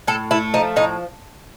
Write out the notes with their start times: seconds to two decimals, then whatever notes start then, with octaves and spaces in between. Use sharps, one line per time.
0.07 A2 A4
0.31 A3 E4
0.54 F3 D#4
0.76 A2 D#4